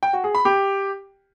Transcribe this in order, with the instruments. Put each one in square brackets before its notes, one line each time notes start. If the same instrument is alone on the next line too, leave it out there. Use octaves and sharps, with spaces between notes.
[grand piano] G5
F#4
G#4
B5
G4